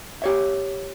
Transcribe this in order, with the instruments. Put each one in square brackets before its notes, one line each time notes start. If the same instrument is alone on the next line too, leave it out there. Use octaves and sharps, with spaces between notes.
[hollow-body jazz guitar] G4 C#5 E5